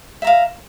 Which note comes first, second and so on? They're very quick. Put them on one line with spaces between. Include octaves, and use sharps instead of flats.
E5 A#5 F5